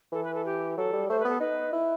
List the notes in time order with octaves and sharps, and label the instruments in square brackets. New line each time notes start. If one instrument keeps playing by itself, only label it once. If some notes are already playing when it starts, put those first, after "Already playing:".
[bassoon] E3 [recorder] A4
[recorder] B4
A4
G4
[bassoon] F#3 [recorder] A4
[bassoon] G3
[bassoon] A3 [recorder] C5
[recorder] B4
[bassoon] B3 [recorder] A4
[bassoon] D#4 [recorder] B4
[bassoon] E4